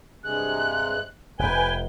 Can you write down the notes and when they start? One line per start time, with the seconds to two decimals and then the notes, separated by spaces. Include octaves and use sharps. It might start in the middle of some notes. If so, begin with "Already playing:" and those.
0.24 G2 C3 G#3 F#6
1.39 F1 B4 G5 G#5 G7